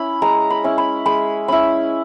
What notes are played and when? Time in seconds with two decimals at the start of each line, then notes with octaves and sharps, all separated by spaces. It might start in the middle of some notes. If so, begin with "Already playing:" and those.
Already playing: C#4 E4 B5
0.22 G#3 A#5
0.50 B5
0.64 C#4 E4
0.78 B5
1.06 G#3 B5
1.48 C#4 E4 B5